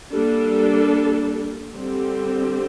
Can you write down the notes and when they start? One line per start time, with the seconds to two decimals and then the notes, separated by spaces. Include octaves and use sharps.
0.12 G3 A#3 D4 A4
1.76 D3 G3 C4 G4